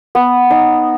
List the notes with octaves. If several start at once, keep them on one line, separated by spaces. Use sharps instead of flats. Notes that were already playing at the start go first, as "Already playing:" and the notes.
B3
D#4